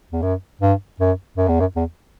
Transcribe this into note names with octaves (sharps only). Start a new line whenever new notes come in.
E2
F#2
G2
F#2
F#2
E2
F#2
E2